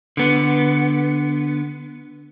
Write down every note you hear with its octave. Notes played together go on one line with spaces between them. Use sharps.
D3 B3